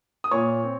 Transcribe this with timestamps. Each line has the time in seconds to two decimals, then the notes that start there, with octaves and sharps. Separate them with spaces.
0.24 D#6
0.31 A#2 C#5 C#6
0.64 C4